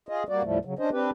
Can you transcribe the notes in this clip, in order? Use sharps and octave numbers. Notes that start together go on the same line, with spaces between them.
F4 G#4 D#5
G3 A#3 F#4 D5
D#2 A2 F3 G3 A3
C#3 F#3
C#4 D4 C5 D#5
C4 D4 G4 B4